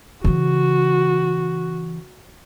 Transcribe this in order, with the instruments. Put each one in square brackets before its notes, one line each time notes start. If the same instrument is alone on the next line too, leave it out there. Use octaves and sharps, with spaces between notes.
[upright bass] C#3 E3 [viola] F#4